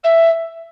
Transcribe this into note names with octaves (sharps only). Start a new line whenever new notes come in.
E5